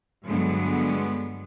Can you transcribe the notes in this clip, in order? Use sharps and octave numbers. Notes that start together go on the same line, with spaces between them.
G2 D3 F#3 G#3 B3